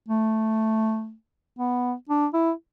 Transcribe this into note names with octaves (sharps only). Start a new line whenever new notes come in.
A3
B3
D4
E4